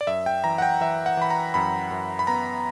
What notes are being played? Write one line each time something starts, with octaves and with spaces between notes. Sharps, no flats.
D5
F#2 E5
G5
E3 A#5
F#5
G5
E3 E5
F#5
E3 B5
A#5
F#2 B5
F#2
B5
B3 A#5